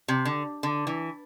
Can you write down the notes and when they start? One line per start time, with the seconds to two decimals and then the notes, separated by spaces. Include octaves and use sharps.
0.08 C3
0.25 D3
0.63 D3
0.87 E3